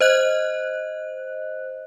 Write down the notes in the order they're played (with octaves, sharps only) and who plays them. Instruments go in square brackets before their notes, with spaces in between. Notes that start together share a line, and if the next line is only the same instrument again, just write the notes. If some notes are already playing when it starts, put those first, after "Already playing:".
[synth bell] C5 D#5 F#6